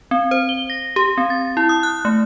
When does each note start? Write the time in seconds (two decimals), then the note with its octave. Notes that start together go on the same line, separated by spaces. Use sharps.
0.11 C4
0.31 C5
0.49 G7
0.70 A#6
0.96 G4
1.18 C4
1.30 A6
1.57 E4
1.69 D#6
1.83 F#6
2.05 A3